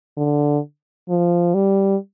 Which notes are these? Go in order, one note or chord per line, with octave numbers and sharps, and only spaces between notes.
D3
F3
G3